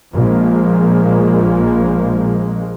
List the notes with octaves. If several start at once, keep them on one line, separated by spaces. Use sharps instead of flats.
A#1 F3 G#3 A#3